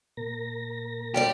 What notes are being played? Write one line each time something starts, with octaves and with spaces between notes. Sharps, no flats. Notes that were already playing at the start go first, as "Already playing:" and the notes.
A#2 A#4 A#6
A#2 G3 G4 A4 C5 D5